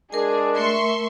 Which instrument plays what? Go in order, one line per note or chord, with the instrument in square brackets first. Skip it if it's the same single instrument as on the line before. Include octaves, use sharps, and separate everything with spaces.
[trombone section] G#3 D4 [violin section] G#4 [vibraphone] A#4 G#5
[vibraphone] A3 A#4 [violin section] E5 C6 C#6